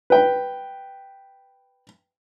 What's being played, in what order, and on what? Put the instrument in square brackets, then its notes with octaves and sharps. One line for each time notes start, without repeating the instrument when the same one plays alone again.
[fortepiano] B4 G5